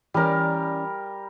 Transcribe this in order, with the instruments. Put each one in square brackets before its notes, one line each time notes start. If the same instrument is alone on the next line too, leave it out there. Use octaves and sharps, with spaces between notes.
[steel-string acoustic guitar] E3 C#4 D5 [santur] G3 A#4